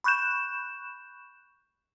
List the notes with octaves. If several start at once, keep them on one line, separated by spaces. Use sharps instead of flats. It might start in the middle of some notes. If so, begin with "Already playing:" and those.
B5 C#6 F#6 G6 E7